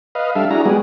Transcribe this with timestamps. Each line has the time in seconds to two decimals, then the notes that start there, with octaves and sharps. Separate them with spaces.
0.15 B4 D#5 F5
0.36 G3 D4 A4 E5 F5
0.51 D4 E4 F#4 G#4 A#5
0.66 G3 G#3 B3 F#4 G#4